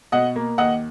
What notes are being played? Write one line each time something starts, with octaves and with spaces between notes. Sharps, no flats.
B2 D#5 F#5
A#3
D#2 D#5 F#5